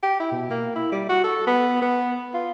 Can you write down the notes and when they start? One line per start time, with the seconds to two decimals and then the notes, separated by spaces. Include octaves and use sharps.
0.03 G4
0.20 E4
0.32 B2
0.50 A#3
0.76 E4
0.92 G3
1.09 F#4
1.24 A4
1.47 B3
1.82 B3
2.34 F4